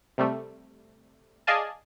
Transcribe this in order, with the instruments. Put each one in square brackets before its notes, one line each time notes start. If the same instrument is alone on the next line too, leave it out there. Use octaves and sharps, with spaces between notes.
[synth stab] C3 G3 A3
G#4 D5 D#5 F5 G#5 A5